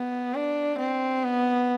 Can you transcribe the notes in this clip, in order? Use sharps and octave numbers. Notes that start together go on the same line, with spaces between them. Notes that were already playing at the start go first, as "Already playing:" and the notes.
Already playing: B3
D4
C4
B3